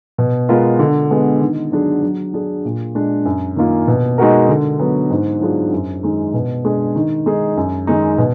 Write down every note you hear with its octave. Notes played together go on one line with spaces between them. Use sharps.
B2
G#3 B3 F4 A#4
D3
G#3 B3
D#3
F#3 D4 G#4
F#3
D4 G#4
A#2
G#3 D4
F#2
D#3 A#3 F4
B2
G#3 D#4 F#4 A#4
D3
F#3 B3
G#2
F#3 D4 F4 G#4
F#2
D#3 G#3 D#4
B2
G#3 D4 G#4
D#3
G#3 D#4 G#4
F#2
D#3 G#3 D#4
B2